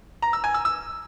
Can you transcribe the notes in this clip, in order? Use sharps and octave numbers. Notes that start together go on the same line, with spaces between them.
A#5
E6
G#5
E6
E6